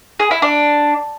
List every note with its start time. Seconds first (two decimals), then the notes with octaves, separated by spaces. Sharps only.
0.19 G#4
0.31 E4
0.42 D4